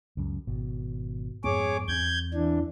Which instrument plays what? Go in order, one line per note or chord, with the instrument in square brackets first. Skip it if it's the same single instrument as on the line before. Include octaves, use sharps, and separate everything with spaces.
[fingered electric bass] C#2 F#2
G#1 B2
[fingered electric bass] F2 G#2 B3 [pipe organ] G#4 C#5 D6
[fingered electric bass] E2 B3 C4 [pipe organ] G6 G#6
[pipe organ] E3 D4